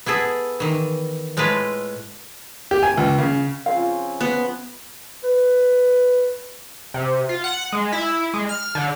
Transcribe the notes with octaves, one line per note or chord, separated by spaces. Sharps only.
B3 E4 G#4 A4
D#3 E3
A2 G#3 A3 F4 B4
G4
G#5
C#2
C#3
C#3 F3 C4 F5
B3
B4
C3
F4
F#5
G#3
E4
G#3
F6
D3